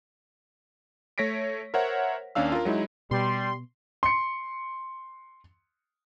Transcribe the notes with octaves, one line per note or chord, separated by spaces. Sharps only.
A3 C#5 A#6 B6 D7
A#4 C5 C#5 E5 F#5
D#2 C#4 D4 F5 E6
F4 A#4
F#3 G#3 D#4 E4
B2 G3 C6
C6 C#7